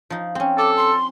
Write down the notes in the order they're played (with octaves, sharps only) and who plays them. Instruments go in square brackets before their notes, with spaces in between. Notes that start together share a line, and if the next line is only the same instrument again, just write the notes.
[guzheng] F3 D#4
C4 C#4
[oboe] A4 [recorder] D6
[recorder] C6